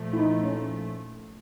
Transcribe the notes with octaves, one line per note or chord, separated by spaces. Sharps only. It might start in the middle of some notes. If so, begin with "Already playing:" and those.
Already playing: A#2 F3 A3
E4
D#4
C#4